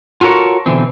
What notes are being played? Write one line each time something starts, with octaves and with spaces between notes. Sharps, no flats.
F4 F#4 A4 A#4 C#5
B2 D3 E3 C4